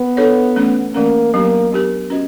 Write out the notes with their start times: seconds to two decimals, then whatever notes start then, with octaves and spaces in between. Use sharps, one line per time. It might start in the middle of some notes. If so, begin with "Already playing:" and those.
Already playing: B3
0.17 D4 F4 A4 C#5
0.56 E3 A3 C#4
0.94 E3 A3 A#3 C#4
1.33 F#3 A#3 B3 D4 G4 A#4
1.72 F#3 B3 D4 G4 A#4
2.10 C#4 F#4 B4 D#5